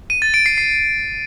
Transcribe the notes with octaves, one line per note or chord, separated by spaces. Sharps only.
D#7
A6
D7
C7
C7